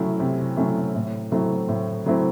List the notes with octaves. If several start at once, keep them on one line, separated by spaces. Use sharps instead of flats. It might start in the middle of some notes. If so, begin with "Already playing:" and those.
Already playing: C3 F#3 A3 C#4 E4
C3
F#3 A3 C#4 E4
A2
F#3 A3 C4 E4
A2
F#3 A3 C4 E4